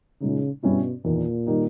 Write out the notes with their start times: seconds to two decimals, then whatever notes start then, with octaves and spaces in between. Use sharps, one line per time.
0.21 A#2 C#3 G#3 D#4
0.63 G2 B2 G3 C#4 E4
1.05 E2 A#2 D#3 A#3
1.47 D#3 G3 A#3 D#4